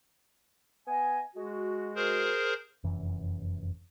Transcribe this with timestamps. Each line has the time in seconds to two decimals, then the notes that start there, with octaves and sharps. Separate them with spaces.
0.87 B3 D#5 G#5
1.36 G#3 F#4
1.95 G#4 A#4 C5
2.84 F1 F#2 E3